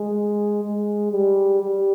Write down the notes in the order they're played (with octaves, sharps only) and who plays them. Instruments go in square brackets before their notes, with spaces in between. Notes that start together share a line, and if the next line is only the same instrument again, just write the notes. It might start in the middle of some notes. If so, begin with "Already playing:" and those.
Already playing: [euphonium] G#3
G#3
G3
G3